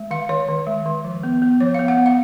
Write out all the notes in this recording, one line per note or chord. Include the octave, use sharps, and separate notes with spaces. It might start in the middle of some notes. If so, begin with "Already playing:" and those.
Already playing: G#3
D#3 F5
D#3 C#5
D#3
G#3
D#3
F3
B3
B3
F3 C#5
F5
B3
F#5
B3
F5